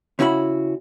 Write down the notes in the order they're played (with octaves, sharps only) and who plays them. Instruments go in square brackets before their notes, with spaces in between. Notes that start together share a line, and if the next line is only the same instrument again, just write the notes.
[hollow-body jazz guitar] C#3 C#4 E4 F#4 B5